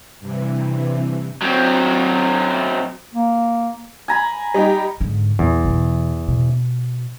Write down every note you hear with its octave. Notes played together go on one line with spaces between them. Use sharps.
G2 C3 E3
F#3 C4
A#3
G#5 A#5 B5
G3 D#4 G4
G#2 D3
E2 A#2
B2 E3
B2